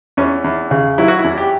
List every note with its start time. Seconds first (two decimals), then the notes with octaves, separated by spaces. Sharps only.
0.17 E2 C#4
0.44 E2
0.71 C#3
0.98 F#3 E4
1.08 F#4
1.19 E4
1.24 E2
1.38 G4